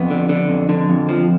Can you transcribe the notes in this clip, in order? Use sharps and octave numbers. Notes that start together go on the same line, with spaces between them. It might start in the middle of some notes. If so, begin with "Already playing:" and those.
Already playing: F2 B3
D3
D3
F2
D3
F2
F3